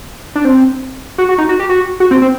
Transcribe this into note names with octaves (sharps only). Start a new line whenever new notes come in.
D4
C4
F#4
F#4
D#4
F#4
G4
F#4
F#4
C4
C4